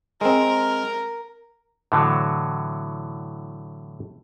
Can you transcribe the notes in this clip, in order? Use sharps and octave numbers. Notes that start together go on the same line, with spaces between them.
G#3 C4 A#4
A2 D3 E3 F#3